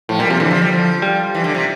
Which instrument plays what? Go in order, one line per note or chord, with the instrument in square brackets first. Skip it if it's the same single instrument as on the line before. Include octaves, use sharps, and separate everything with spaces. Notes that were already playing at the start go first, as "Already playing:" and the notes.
[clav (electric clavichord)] A2 [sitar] F3
[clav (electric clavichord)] A#2 [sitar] G3
[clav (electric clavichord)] C3 [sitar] F3
[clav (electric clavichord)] D3 [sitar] E3
[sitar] F3
G3
F3
[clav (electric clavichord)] G3
[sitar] E3
D3
C3